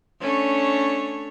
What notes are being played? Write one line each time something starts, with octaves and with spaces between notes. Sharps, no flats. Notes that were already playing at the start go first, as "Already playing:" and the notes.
A3 C#4 D4 C#5